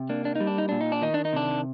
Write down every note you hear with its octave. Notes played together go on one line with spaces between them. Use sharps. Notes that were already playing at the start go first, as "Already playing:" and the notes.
Already playing: C3
A#3 D4
D4
G3 D#4
D4
D#4
A#2 D4
D#4
D4
D#3 D#4
D4
D#4
C3 D4